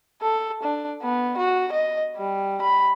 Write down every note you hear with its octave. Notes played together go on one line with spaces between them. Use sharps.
A4
D4
B3
F#4
D#5
G3
B5